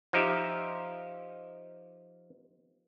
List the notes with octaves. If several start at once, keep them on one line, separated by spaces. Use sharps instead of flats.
F3 D#4 G4 E5